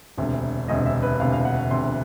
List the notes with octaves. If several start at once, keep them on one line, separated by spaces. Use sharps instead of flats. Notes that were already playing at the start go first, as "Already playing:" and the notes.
E1 D2 C3
E1 D2 C3 D#5
E5
B4
E1 D2 C3 F5
F5
F#5
E1 D2 C3 C6